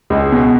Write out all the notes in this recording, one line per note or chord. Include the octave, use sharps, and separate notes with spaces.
C#2 G#3
B2